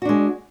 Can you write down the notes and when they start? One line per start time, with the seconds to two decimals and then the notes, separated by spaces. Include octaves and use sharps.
0.02 F#4
0.05 D4
0.09 G#3